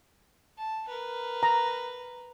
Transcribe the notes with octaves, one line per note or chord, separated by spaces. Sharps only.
A5
A#4 B4
A#5